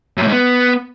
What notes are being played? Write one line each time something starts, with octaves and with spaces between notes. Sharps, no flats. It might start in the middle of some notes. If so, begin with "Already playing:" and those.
F#2
A2
G#2
B3